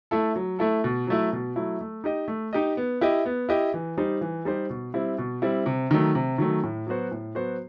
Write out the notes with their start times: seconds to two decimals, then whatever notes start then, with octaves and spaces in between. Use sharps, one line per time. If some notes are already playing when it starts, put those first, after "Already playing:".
0.11 A3 E4 A4
0.36 F#3
0.59 A3 E4 A4
0.84 B2
1.07 F#3 A3 E4
1.32 B2
1.56 F#3 A3 E4
1.81 A3
2.04 D#4 G4 D#5
2.28 A3
2.53 D#4 G4 D#5
2.77 B3
3.01 E4 G4 D#5
3.26 B3
3.49 E4 G4 D#5
3.74 E3
3.97 G3 D#4 G4 C5
4.21 E3
4.45 G3 D#4 G4 C5
4.70 B2
4.94 G3 C4 E4
5.18 B2
5.42 G3 C4 E4
5.66 C3
5.91 D#3 F#3 A3
6.15 C3
6.38 D#3 F#3 A3
6.63 A2
6.87 F#3 B3 F#4 C5
7.11 A2
7.35 F#3 B3 F#4 C5